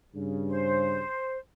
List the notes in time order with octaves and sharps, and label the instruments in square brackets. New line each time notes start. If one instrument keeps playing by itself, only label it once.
[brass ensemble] G2 C#3
[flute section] C5